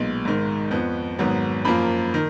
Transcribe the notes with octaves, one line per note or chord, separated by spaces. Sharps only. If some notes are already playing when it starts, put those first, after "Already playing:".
Already playing: B1 A#2 G#3 B3
G#1 G#2 D#3 G#3
F2 F3 B3
G#1 G#2 F#3 B3
F#2 F3 A#3 B5
D#3